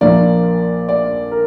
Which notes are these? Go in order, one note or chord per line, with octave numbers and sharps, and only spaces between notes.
A#1 A#2 F3 A#3 D5
D5
A#4